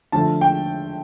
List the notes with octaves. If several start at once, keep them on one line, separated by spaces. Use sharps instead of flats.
D3 F3 A3 A5
G5